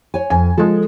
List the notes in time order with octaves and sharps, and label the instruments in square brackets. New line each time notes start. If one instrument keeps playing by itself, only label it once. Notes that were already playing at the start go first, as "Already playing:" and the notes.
[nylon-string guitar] C#5 G#5
[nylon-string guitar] F2 [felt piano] G#5
[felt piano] F3 G#3 [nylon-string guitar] A4